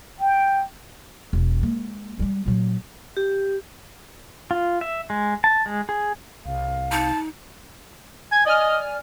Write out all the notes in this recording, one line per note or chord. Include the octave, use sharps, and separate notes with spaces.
G5
E1
G#3 A#3
G3 G#3
A#2 F#3
G4
F4
E5
G#3
A5
G#3
G#4
C2 F5
D#4 A5
G#5 G#6
D5 D#5 G#5 F6